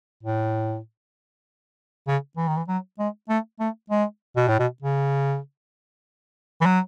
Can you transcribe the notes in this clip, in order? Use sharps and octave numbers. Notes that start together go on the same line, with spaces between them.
A2
C#3
E3
D#3
E3
F#3
G#3
A3
A3
G#3
B2
A2
B2
C#3
E3
F#3